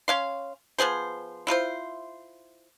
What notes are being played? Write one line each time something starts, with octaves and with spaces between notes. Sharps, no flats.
C#4 F5 C6
F3 B3 G#4 C5
E4 F4 A4 C5